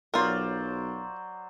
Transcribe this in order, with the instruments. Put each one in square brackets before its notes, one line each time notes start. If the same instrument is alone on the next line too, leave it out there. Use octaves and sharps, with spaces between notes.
[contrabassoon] B1 [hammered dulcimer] F#3 C5 D5 [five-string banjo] F4 A#4